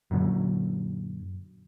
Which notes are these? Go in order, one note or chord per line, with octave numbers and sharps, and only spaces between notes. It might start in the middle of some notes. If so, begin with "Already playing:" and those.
F#2 A#2 D3 F#3